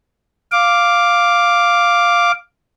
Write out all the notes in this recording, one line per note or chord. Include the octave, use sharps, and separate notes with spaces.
F5 D6